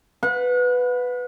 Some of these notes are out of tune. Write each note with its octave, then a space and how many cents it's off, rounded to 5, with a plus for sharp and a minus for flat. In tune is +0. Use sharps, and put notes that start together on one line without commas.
B4 +5 F#5 -40